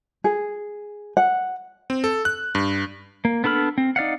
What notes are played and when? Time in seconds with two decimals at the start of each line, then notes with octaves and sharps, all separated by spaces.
0.24 G#4
1.17 F#5
1.90 C4
2.04 A4
2.25 F#6
2.55 G2
3.25 A#3
3.44 B3 D4 A4 B5 F6
3.78 C4
3.96 D#4 D5 F5 F#5